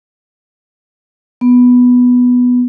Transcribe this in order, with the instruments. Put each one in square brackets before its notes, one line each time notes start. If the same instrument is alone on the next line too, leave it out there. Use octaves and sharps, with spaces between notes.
[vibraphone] B3